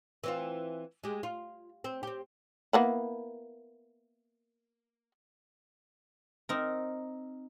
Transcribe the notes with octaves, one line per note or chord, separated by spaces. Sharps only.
E3 C4 F4
G#3 G4
F4
C4
C4 G4
A#3 B3 E4
C4 D#4 A#4